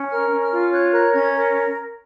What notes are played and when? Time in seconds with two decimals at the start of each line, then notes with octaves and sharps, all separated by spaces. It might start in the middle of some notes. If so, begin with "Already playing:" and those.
Already playing: C#4
0.09 A#4 F6
0.30 C#4
0.41 F6
0.51 F4
0.71 C#5 F#6
0.92 A#4 F#6
1.13 C#4 G#6
1.34 A#4